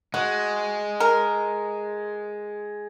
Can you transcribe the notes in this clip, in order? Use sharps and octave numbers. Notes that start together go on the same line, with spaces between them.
G#3 F#4
A#4